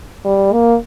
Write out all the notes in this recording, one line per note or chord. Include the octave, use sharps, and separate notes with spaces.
G3
A#3